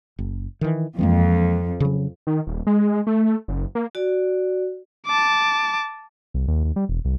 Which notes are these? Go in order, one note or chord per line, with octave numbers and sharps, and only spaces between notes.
F#1
D#3 E3
F2 E3 G#3 A#3
C#3 F#3
D#3
D#1
G#3
A3
F#1
A#3
F#4 D5
A5 D6
C2
D#2
D#2
G3
E1
C2